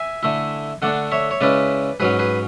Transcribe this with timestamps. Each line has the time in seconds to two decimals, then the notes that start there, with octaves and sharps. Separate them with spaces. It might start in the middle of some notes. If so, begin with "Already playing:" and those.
Already playing: E5 G#5
0.23 D3 A3 E4
0.82 D3 A3 D4 D5 F#5
1.11 C#5 E5
1.31 C#5
1.41 C#3 G#3 C#4 E4 B4 D5
2.00 G#2 F#3 C#4 G#4 B4
2.19 G#4 B4